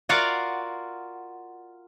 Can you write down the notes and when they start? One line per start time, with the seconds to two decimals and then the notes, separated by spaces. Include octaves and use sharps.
0.09 F4 F#4 A#4 D5 F5 F#5